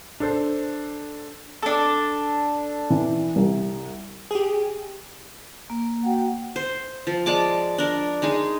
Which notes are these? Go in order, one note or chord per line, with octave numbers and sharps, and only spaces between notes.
D4 A4 C5
D4 A4
E3
C2
G4 G#4
A#3
F#4 F#5 G5
C5
F3
G#3 D5 A5 D6
D4 A#4
G#3 D#4 G#4